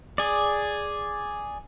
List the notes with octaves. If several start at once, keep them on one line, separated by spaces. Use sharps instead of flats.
G#4 D5